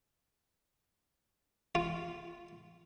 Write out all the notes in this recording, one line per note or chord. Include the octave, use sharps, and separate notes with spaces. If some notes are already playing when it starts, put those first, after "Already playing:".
F4